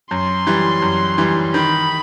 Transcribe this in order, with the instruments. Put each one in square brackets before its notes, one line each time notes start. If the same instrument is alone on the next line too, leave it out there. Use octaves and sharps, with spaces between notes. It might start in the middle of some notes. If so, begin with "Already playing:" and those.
[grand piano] F#2 [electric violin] C6
[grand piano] E3 G3
F#2
E3 G3
[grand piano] D#3 [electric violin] B5